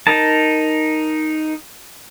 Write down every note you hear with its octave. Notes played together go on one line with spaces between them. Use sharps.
D#4 A#4 A5